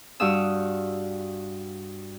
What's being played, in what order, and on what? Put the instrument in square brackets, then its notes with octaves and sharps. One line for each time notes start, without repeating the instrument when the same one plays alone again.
[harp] G2 F#4 G4 F5 D#6 E6